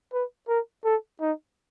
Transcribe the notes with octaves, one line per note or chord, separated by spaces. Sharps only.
B4
A#4
A4
D#4